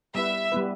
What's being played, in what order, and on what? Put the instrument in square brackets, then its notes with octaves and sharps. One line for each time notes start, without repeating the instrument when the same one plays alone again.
[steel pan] G3 B3 E4 B4 [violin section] E5
[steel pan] G3 B3 E4 B4